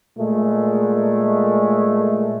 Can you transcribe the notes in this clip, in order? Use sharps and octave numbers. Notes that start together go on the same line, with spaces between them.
A#2 G#3 A3